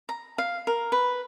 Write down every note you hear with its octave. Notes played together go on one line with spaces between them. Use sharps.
A#5
F5
A#4
B4